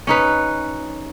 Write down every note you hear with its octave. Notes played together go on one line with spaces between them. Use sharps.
C#4 D#4 B4